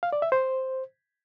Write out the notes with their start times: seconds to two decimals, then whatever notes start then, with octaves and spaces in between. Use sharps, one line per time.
0.03 F5
0.13 D5
0.22 E5
0.32 C5